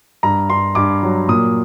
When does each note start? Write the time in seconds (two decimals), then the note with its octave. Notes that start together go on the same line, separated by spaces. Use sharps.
0.23 G2 A#5
0.50 G2 C6
0.75 G2 D6
1.03 F#3
1.28 A#2 D#6